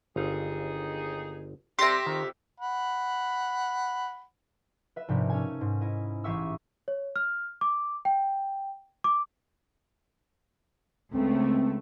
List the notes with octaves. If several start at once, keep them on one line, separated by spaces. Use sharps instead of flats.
G1 D#2 D#4 G#4 F5
C3 G3 G4 E5 C6 A#6
F2 D#3
F#5 B5
B4 E5
A#1 G#2 C3 D#4 G4
C#4 A4 G#5
G#2
E4 D#5
A1 G4 G#4 E5 C#6 E6
C#5
F6
D6
G5
D6
C#2 A3 C4